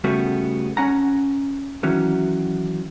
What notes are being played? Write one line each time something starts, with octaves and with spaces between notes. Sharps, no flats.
C#3 G3 A3 B3 F#4
C#4 F#5 A#5
D#3 E3 F#3 C#4